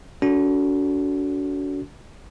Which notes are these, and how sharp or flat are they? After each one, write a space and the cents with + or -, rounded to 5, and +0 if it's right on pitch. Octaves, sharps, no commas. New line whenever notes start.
D4 -45 F#4 +0 A4 +0